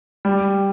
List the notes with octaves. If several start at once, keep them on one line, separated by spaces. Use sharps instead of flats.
G3